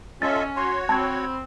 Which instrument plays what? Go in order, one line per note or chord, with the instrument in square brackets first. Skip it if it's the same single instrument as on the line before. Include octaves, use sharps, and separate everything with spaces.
[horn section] C#4 [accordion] F4 A4 E5 [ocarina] D#5 [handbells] A6
[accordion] F#4 C#5 [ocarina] C6
[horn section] C4 [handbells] A5 G#6 [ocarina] B5